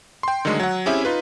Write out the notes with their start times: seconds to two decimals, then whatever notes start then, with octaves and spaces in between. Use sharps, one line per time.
0.23 G5 C6
0.45 D3 D#3 F#3 G#3 A3
0.60 F#3 F#5
0.86 C4 C#4 E4 G4 G#4 E5
1.05 D#4 F4 B4